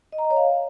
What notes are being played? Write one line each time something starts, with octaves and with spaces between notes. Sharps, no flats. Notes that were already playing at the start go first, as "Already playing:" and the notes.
D#5
A#5
D#5
C#5
F5